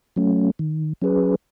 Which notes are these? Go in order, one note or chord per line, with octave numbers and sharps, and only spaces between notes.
F#3 A3 C#4
D#3
F#3 C#4 G#4 B4